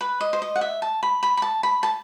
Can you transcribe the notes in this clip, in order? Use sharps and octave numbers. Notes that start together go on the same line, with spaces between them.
B4
D#5
C5
D#5
F#5
E5
A5
B5
B5
B5
A5
B5
A5